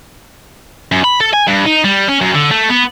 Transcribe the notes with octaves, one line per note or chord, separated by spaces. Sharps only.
F#2
B5
A4
G#5
G2
D#4
G3
C#4
F#2
D3
A3
B3